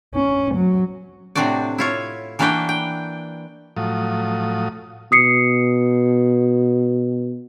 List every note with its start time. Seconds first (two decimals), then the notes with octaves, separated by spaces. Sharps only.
0.15 C#4
0.55 F#3
1.35 A2 C3 C4 D4 F#4 D5
1.78 E4 F4 C#5
2.39 E3 A#3 D4 F#4 B4 G5
2.69 G5
3.77 A2 F3 F#3 D#6
5.12 B2 D#6 C7 C#7